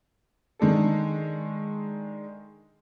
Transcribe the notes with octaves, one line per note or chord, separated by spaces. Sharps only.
D#3 G#3 D4 A4